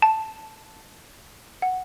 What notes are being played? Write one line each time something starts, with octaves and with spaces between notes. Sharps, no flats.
A5
F#5